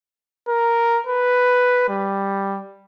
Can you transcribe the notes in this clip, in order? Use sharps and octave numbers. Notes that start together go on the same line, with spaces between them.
A#4
B4
G3